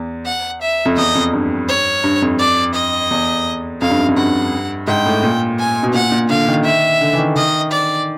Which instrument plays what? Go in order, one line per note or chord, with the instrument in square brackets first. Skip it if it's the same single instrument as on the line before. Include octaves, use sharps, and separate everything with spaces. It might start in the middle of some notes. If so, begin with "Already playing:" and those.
Already playing: [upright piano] E2
[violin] F#5
E5
[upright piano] F2
[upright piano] E2 [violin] D#5
[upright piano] F2
G2
[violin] C#5
[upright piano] G2
F2
[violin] D5
D#5
[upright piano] E2
[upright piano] F2 [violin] F5
[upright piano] G2
F#2
F2
[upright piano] G2 [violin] F#5
[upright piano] G#2 [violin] G5
[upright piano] A2
A#2
[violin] G#5
[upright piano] B2
[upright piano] A#2 [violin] F#5
[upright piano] A#2
[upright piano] D3 [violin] F5
[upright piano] D#3
[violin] E5
[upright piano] D3
E3
D#3
[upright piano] D#3 [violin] D#5
[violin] D5